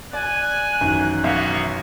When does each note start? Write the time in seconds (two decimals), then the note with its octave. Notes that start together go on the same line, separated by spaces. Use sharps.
0.13 D5 G#5 F#6
0.81 A1 F#2 D#3
1.24 B1 A#3 B3 E5 F5 C#6